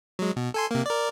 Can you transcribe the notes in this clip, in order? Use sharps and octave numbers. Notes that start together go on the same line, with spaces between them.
F#3 G#3
B2
A4 G#5 C6
C3 A#3
A#4 D5